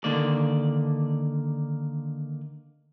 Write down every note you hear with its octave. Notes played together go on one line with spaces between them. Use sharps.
D3 D#3 A#3 D5